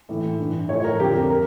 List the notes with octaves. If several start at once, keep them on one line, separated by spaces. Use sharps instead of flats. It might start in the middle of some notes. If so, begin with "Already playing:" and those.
A2 E3
G2 E3
A2 F3 C#5
C#5
A#4
F2 D3 F3 G4
A#4
A#4